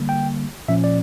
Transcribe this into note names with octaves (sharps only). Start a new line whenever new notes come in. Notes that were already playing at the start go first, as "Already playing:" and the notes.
Already playing: D3 G3 A#3
G5
A#2 F3 C#4 E5
D5